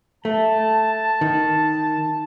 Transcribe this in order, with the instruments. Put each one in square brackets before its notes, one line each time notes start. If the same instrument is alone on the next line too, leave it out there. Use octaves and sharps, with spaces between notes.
[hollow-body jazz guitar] A3 [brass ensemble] A5
[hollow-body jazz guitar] D#3